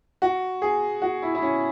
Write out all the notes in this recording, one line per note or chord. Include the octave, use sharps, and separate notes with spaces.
F#4
G#4
F#4
E4
E4
C#4